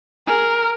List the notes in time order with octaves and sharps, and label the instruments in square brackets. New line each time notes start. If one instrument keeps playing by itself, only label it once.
[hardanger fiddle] G#4 [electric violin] A#4